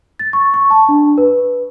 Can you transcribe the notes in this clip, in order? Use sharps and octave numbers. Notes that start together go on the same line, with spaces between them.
A6
C#6
C#6
A5
D4
B4